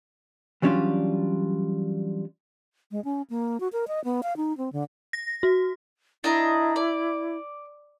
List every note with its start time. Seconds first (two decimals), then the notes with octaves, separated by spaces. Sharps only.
0.62 E3 F#3 G3 C#4 D4 F4
2.92 G#3
3.05 C#4
3.30 A#3
3.60 F#4
3.73 A#4
3.88 D#5
4.04 B3
4.23 F5
4.37 D#4
4.58 C4
4.73 D3
5.13 A#6
5.43 F#4
6.24 D4 E4 D#5 A#5
6.76 D5